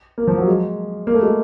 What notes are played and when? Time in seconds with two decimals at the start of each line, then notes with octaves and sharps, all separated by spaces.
0.18 A#3
0.28 F3
0.38 F#3
0.47 G#3
1.07 A#3
1.14 A3
1.23 G#3